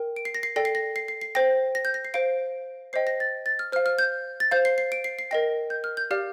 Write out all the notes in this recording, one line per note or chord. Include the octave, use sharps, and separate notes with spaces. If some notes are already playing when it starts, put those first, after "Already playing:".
Already playing: A#4 G5
D7
C7
A#6
C7
A4 D5 G5 A#6
C7
A#6
C7
C7
C7
C5 G5 A#6
A#6
G6
A#6
C7
C5 F5 D7
C5 D#5 G5 C7
A#6
A6
A6
F6
C5 F5 F6
F6
G6
A6
C5 F5 G6
C7
C7
D7
C7
C7
A#4 D#5 G5 A#6
G6
F6
G6
G4 D5 F5 F6